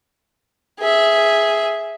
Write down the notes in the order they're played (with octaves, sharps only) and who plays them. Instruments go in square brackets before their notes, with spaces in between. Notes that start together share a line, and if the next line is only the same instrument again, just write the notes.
[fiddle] G#4 E5